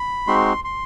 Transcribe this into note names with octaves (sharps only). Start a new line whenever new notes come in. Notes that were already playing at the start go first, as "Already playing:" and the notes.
Already playing: B5
G#3 C4 D#4 F#4 C6
C6